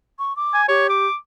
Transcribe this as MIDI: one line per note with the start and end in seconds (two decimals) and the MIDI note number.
0.19 0.36 85
0.36 0.62 86
0.54 0.67 80
0.69 1.08 67
0.69 0.89 73
0.90 1.16 86